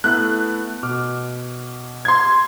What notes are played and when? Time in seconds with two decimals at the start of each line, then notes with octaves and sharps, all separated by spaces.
0.04 A3 B3 E4 F#6
0.83 B2 D6 F6
2.05 C6 G#6